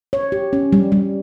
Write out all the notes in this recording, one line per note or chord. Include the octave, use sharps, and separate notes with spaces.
C#5
G4
C#4
G3
G3